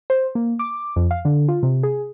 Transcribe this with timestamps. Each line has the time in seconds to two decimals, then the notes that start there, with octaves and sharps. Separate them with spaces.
0.10 C5
0.35 A#3
0.59 D6
0.96 F2
1.11 F5
1.25 D3
1.48 F4
1.63 C3
1.83 G#4